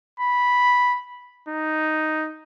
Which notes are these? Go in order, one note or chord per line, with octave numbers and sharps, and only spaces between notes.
B5
D#4